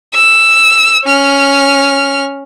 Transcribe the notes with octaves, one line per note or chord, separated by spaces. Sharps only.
E6
C#4 F6